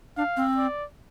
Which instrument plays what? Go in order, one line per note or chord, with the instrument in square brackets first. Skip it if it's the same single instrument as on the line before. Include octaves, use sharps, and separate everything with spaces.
[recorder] D4 [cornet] F5
[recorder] C4
[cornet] D5